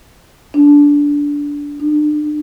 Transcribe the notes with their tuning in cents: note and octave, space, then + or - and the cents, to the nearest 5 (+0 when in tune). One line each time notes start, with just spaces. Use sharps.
D4 -20
D4 +40